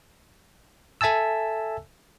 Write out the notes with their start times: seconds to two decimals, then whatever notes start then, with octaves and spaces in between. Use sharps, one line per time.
1.01 A4 E5 G#5 A5 E6